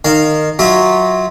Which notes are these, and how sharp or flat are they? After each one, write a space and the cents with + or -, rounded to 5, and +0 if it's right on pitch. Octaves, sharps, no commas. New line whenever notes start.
D#3 -20 F5 +0
F#3 +0 F4 +0 E5 -30